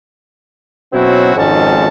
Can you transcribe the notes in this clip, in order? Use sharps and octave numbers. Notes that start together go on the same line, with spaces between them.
B2 F#3 C4 C#4 E4 F#4
G#1 F2 G#2 C#4 F#4 A5